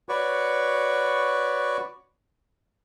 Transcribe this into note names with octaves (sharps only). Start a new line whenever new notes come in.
F#4 B4 C#5 D5 C#6